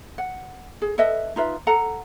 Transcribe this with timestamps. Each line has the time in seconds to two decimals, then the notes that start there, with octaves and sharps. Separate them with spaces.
0.18 F#5
0.82 G#4
0.98 A4 B4 D#5 E5
1.36 D#4 F4 B4 E5
1.67 A4 F#5 A#5